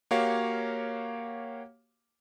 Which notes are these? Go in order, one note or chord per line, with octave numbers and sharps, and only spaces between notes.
A#3 F#4 G4 C#5 F5